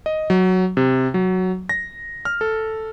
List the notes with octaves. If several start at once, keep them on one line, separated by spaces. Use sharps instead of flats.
D#5
F#3
C3
F#3
A#6
F6
A4